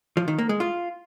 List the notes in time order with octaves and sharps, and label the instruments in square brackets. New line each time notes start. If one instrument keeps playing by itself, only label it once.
[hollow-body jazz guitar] F3
D#3
A#3
G#3
F4